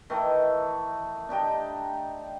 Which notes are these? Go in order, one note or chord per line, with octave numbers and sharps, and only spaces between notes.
D#3 E3 A3
D4 D#4 G4 G5